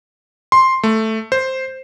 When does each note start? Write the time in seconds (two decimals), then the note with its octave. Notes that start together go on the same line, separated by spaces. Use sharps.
0.52 C6
0.83 A3
1.32 C5